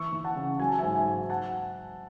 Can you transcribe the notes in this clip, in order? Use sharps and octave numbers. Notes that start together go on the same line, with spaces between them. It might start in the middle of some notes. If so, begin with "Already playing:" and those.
Already playing: E3 C#6 E6
E3
F#5 A5
C#3
F#3 G#5
A5
G#2 E5 G#5
E5 G#5
G#2
F#5 A5